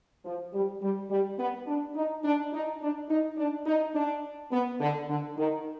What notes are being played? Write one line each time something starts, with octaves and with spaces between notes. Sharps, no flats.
F3
G3
G3
G3
B3
D4
D#4
D4
D#4
D4
D#4
D4
D#4
D4
B3
D3
D3
D#3